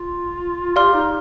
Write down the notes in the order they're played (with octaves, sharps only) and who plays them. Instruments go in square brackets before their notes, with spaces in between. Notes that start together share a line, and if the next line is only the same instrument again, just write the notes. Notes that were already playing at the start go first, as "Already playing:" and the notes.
Already playing: [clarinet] F4
[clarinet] G4 [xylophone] D5 F5 C6 F6
[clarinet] D#4